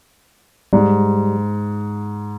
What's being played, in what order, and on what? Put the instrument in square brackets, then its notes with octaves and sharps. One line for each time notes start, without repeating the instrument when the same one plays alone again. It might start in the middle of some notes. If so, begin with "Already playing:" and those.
[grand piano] G#2 [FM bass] G3